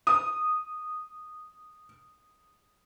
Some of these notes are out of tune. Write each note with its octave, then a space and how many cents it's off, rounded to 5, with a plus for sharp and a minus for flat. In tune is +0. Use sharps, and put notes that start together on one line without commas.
D#6 -10